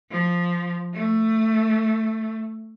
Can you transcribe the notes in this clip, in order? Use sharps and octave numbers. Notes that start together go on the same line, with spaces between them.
F3
A3